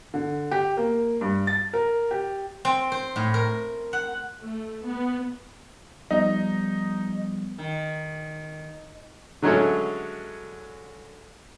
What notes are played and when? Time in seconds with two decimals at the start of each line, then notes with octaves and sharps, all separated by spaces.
0.14 D3
0.51 G4
0.77 A#3
1.21 G2
1.47 A6
1.73 A#4
2.11 G4
2.65 C4
2.92 C5
3.16 A2
3.34 A#4
3.93 F#5
4.42 A3
4.86 B3
6.11 F3 G3 B3 D#4
7.58 D#3
9.42 D3 F#3 G#3 A3 C#4